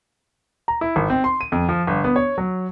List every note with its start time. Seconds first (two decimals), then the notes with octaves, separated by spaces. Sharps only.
0.68 A#5
0.81 E4
0.96 G#1
1.10 C4
1.24 C6
1.41 D#7
1.52 F2
1.69 F3
1.87 G1
2.04 B3
2.16 C#5
2.38 F#3